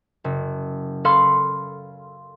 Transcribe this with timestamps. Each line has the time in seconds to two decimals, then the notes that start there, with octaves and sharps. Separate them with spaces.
0.24 F#1
1.05 A4 C#5 F5 B5 C6 F6